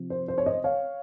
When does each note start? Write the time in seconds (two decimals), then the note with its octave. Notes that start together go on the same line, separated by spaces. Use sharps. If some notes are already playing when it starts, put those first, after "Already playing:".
Already playing: C3 F3
0.10 C5
0.28 C5
0.38 C#5
0.46 C5 D#5
0.64 C#5 F5